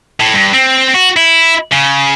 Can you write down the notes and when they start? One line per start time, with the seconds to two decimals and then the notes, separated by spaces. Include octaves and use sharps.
0.20 A2
0.34 G2
0.53 C4
0.94 F#4
1.16 E4
1.71 C#3